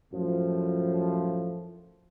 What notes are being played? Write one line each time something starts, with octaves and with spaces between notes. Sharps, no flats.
F#2 A2 F3